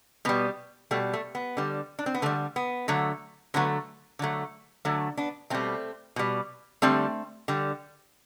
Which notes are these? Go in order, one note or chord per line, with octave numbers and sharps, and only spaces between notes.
B2 G3 B3
B2 G3 A3
A3
B3
D3 G3
D4
C4
B3
D3 G3 A3
B3
D3 F#3 A3
D3 F#3 A3 B3
D3 F#3 A3
D3 F#3 A3
B3 D4
B2 G3 A3 C4
B2 G3
D3 G3 A3 C4
D3 G3